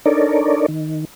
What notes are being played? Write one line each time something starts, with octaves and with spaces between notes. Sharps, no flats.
D4 D#4 A4 A#4 C#5 D5
D#3